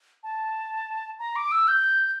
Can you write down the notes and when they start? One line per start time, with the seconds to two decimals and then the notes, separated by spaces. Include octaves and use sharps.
0.23 A5
1.19 A#5
1.36 D6
1.52 E6
1.68 G6